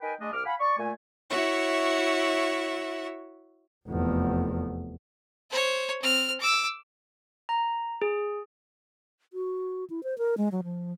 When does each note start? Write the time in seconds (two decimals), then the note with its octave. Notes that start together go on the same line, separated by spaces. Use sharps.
0.02 D#4 A#4 B4 G5 G#5
0.21 G#3 A3 D4 D#5
0.33 C2 D6 F6
0.45 F5 F#5 G#5 B5
0.60 D5 C#6
0.78 A#2 A3 G#5
1.30 E4 F#4 C#5 E5
3.87 F1 E2
5.50 C5 C#5
6.02 C4 F6
6.40 D6 E6
7.49 A#5
8.02 G#4
9.33 F#4
9.90 E4
10.03 C5
10.18 A#4
10.38 G#3
10.52 F#3
10.64 F3